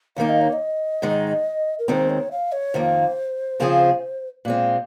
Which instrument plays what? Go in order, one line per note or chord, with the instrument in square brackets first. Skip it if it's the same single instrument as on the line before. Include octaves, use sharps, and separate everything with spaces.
[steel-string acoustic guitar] D#2 D#3 A#3 D#4 [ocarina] F5
[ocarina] D#5
C#5
D#5
[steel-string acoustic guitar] G#2 D#3 G#3 D#4
[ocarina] A#4
[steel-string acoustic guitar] D#2 D#3 G#3 C4 [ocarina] C5
[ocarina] C#5
F5
C#5
[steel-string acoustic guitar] F2 D#3 A#3 [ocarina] C5
[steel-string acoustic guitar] C#3 F3 C4 F4 G#4
A#2 G#3 C4